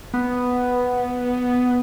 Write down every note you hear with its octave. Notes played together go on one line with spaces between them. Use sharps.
B3